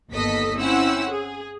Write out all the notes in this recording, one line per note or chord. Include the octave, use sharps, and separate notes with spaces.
G1 D#2 B3 A4 D#5 B6
C4 C#4 E4 F#5 E6
G#4